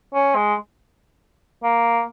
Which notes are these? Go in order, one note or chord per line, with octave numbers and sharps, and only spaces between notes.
C#4
G#3
A#3